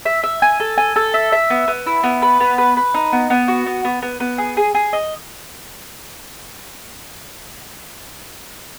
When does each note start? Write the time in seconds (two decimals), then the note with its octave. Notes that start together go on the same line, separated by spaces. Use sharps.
0.06 E5
0.23 E5
0.42 G#5
0.60 A4
0.78 G#5
0.96 A4
1.14 E5
1.32 E5
1.50 B3
1.68 B3
1.86 E4
2.04 B3
2.22 B4
2.40 B3
2.58 B4
2.77 B4
2.94 D#4
3.13 B3
3.30 B3
3.48 F#4
3.66 B3
3.85 B3
4.02 B3
4.20 B3
4.38 G#4
4.57 G#4
4.75 G#4
4.93 D#5